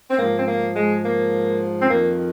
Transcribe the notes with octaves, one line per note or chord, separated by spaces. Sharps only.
C4
G#2 F3 A#3
C4
A#3
G#3
A#3
C4
F2 D#3 A#3